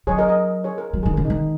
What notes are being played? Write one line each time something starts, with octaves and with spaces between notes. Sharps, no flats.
F#3 G#4 C#5
A#4 D#5
A#4 D#5
G#4 C#5
A#4
F#3
D#3 G#4
C#3 A#4
D#4
D#3